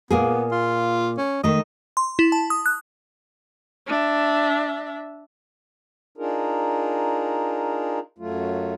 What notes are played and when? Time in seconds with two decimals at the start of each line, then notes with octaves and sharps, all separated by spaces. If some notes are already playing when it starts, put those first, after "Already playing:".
0.10 A#2 A#3 B3 G#4
0.51 F4
1.18 C#4
1.44 D#3 A3 D#5
1.97 C6
2.19 E4
2.32 A5
2.50 D#6
2.66 F#6
3.87 D4 E5
6.18 D4 D#4 F4 G#4 A#4
8.18 F#2 F#3 A3 F4